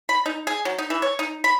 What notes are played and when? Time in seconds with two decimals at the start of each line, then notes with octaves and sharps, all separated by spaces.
0.09 B5
0.26 D#4
0.47 G#4
0.65 F#3
0.78 D#4
0.90 E3
1.02 C#5
1.19 D#4
1.44 B5